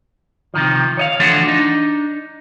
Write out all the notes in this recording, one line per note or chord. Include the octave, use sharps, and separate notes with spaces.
C3 D#3 F3
C#5 D#5 F5
D3 E3 F3 A3 D4 F#4
D4 D#4